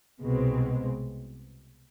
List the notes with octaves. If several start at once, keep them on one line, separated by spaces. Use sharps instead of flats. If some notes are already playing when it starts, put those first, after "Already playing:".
C2 B2 G#3 C4